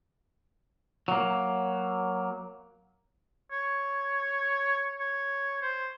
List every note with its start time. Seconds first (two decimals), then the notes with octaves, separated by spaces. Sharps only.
1.08 F#3 A#3
3.52 C#5
4.99 C#5
5.62 C5